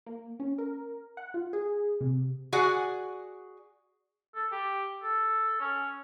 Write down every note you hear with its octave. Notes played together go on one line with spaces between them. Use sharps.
A#3
C#4
A#4
F#5
F4
G#4
C3
F#4 G#4 D5 F#5 G#5
A4
G4
A4
C#4